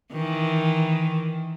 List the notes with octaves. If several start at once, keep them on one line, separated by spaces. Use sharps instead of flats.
D#3 E3